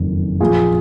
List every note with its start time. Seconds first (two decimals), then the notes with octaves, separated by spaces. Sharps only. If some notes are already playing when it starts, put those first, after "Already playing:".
Already playing: F#1 F2 D#3
0.40 A#1 A#2 F3 F4 G#4